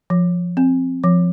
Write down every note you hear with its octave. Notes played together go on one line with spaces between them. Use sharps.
F3
C4
F3